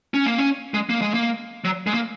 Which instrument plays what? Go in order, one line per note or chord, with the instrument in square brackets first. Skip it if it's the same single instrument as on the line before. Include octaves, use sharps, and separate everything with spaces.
[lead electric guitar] C#4
A#3
C#4
G#3
A#3
G#3
A#3
F#3
G#3
A#3